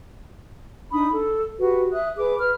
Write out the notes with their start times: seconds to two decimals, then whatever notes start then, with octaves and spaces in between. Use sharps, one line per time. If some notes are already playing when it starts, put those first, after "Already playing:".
0.92 D4 D#4 B5 D#6
1.12 A4
1.60 F#4 G4 B4
1.92 E5 D#6 F#6
2.17 G#4 B4 D6
2.39 B4 F6